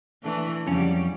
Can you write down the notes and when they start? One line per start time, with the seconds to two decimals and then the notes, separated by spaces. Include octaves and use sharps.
0.23 E3 A3 D4
0.67 F2 C#3 F#3 G3 C#4